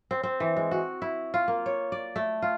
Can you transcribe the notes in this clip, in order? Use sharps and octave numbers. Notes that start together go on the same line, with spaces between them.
C4
C4
E3
G#3
F#4
E4
F4
A#3
C#5
D5
A3
F4